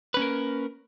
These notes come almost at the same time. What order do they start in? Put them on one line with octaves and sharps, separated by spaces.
B4 C#4 A#3 A#4